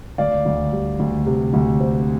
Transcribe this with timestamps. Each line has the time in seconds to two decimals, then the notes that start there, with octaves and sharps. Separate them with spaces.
0.18 D2 D5 F5
0.45 D2
0.72 G3
0.99 D2
1.26 C3
1.53 D2
1.80 C4